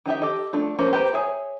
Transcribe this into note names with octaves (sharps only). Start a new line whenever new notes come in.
D#3 D#4 G4 E5
G4 A4 D#5
A3 D4 F4
F3 A#3 C#4 C5 A#5
G4 B4 C5 G5 A#5
G#4 C#5 E5